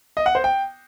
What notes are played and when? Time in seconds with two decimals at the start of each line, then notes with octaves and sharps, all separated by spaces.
0.17 D#5
0.26 F#5
0.35 C5
0.44 G5